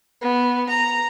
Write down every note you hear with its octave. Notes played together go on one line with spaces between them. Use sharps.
B3
A#5